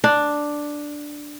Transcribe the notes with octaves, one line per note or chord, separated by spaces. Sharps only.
D4